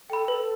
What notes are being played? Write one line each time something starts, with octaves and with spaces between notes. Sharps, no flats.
A4 G5 B5
A4 B4